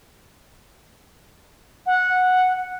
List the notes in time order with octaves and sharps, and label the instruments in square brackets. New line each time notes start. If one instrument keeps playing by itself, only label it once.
[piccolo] F#5